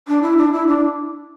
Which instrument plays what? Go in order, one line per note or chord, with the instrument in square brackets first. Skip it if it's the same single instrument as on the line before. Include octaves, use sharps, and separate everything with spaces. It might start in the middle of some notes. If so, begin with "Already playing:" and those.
[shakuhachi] D4
E4
D4
E4
D4